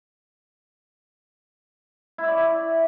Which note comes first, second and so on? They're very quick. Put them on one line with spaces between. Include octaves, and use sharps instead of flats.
E4 E5 D5